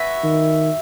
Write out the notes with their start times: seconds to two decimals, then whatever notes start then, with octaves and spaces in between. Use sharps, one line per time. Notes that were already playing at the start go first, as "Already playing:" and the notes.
Already playing: F#4 B4 E5 G#5
0.23 D#3